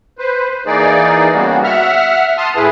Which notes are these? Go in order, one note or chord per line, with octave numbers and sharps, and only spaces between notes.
B4 C5
E3 A#3 D#4 G#4 D5
C#3 G3 A#3 B3 F#4
E5 F#5 F6
A5 C6 D#6 F6
A2 E4 G#4 B4